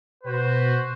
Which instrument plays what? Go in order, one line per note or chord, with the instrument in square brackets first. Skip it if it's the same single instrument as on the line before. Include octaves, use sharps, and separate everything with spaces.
[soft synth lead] B2 [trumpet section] F#4 B4 C5